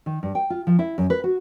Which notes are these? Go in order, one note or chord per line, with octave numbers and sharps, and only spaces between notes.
D#3
G2
G5
F4
F3
E4
F#2
B4
F#4